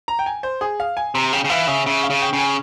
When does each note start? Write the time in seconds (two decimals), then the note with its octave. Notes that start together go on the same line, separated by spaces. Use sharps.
0.08 A#5
0.19 G5
0.26 G#5
0.43 C5
0.61 G#4
0.80 F5
0.97 G#5
1.15 C3 A#5
1.32 C#3 G5
1.44 C#3
1.50 E3 F5
1.67 C#3 E5
1.86 C#3 E5
2.03 F5
2.10 C#3
2.22 G5
2.33 C#3
2.39 G#5